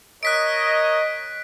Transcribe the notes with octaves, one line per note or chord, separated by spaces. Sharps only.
A#4 C#5 D#5 F#6 B6 D7